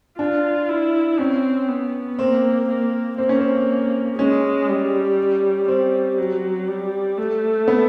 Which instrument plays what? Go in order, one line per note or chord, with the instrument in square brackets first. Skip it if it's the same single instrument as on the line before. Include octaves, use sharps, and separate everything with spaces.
[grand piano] D4 [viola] F4
[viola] E4
[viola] C4 [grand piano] C#4
[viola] B3
[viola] A#3 [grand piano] C4
[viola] A#3
[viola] A#3 [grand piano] C4
[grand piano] C#4
C4
[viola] G#3 [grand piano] C#4
[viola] G3
[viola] G3 [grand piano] C4
[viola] F#3
G3
A3
[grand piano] B3